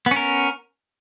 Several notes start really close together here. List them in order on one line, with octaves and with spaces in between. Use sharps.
B3 C#4 A#4